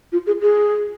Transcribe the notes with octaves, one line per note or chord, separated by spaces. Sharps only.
F4
G#4
G#4